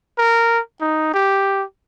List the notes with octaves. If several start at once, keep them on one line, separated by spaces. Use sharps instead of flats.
A#4
D#4
G4